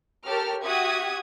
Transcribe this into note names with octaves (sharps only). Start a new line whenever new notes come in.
G4 A4 A#4 C#5 F6
F#4 G4 E5 D#6 G#6